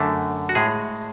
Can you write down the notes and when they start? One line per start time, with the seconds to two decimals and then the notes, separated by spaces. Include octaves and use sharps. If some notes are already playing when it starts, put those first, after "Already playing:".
Already playing: F#2 D3 A3
0.49 F#4
0.55 A2 G#3 G#4